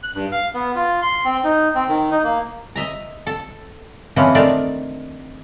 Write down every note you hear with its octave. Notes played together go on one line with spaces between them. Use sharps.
F#6
G2
F5
B3
F4
C6
C4
D#4
C4
D#3
D#4
A#3
D#5 E5 A#5
A4
E3 F3 G#3 C4 C#4
D#3 A3 C4 D4 A#4 D5